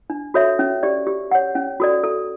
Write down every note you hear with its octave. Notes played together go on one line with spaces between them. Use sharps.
D4
F#4 A4 C#5 E5
C#4
G4 D5
G4
C#5 F#5
C#4
F#4 A4 D5
A4